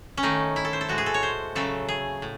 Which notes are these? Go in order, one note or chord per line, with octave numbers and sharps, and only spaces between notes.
C#4
D#3 A3 D#4
E4
A4
C5
A4
A2 G#3 F#4
G#4
A4
C#5
C5
C#3 F#3 A3 A4
G#4
A2